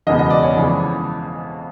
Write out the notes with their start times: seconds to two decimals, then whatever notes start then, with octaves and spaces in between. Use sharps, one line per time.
0.07 F#1 E2 B2 G#3 B3 D#5
0.19 D#5
0.30 D5
0.43 C#5
0.55 F2 C#3 E3 G#3 B3